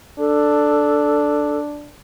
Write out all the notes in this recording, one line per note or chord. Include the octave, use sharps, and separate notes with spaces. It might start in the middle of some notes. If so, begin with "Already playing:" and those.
D4 A4